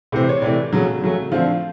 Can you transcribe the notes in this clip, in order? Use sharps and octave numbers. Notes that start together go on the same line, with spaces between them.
C3 E3 A3 C5
C#5
C3 E3 A3 D5
C#3 F#3 A3
C#3 F#3 A3
D3 F3 A3 C4 F5